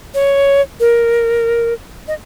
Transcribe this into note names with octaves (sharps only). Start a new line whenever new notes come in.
C#5
A#4
D#5